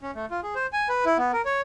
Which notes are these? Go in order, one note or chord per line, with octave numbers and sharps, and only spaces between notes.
C#4
A3
F4
G#4
C5
G#5
B4
E4
B3
A#4
C#5